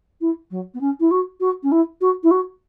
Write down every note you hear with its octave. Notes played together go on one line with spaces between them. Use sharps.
E4
F#3
B3
C#4
E4
F#4
F#4
C#4
E4
F#4
E4
F#4